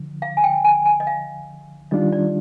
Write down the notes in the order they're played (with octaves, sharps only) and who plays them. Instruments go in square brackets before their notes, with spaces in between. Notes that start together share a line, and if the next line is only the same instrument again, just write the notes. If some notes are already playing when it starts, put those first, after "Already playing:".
Already playing: [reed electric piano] D3 F3
[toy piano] F5
G#5
G5
G#5
G#5
D#5
F5
[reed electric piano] D#3 G3 D4 F4 [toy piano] D#5
[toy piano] D5